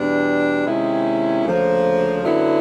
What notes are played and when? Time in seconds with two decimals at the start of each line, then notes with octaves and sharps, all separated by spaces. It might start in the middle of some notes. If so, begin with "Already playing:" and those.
Already playing: E2 B2 G3 B3 D4
0.65 C3 D#3 G#3 C#4 E4
1.44 D2 C#3 F3 A#3
2.22 F#2 D3 F#3 B3 E4